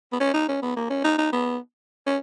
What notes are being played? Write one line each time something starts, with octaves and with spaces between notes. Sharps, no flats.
B3
C#4
D#4
C#4
B3
A#3
C#4
D#4
D#4
B3
C#4